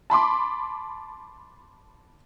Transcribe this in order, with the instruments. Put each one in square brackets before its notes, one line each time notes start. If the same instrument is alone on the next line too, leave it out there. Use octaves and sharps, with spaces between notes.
[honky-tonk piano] A5 B5 C6 D6